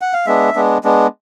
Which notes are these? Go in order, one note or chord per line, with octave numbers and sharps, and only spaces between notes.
F#5
F5
G#3 B3 D4 E5
G#3 B3 D4
G#3 B3 D4